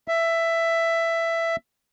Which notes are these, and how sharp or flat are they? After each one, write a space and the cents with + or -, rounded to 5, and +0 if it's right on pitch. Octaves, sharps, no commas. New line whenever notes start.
E5 +10